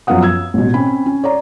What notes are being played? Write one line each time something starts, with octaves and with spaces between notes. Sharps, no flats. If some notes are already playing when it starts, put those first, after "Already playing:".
F#2 F3 B3 F5 F#5 D#6
E6 G#6
A1 B2
C4 C#4 B5
C#4
C#5 D5 A#5